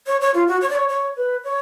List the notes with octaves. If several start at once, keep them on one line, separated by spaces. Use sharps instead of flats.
C#5
C#5
F4
F#4
C#5
D5
C#5
C#5
B4
C#5